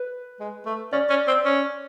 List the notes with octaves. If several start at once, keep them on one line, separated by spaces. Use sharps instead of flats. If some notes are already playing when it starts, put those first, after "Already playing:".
Already playing: B4
G#3
A3
C#4 D5
C#4
C4
C#4